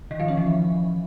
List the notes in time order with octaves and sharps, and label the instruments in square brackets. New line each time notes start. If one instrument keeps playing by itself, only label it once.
[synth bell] D#3
F3
C#4
E3